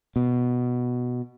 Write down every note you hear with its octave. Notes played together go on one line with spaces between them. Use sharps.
B2